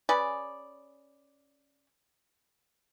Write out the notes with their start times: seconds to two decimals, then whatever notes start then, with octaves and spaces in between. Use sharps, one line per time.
0.09 C#4 G#4 B4 D5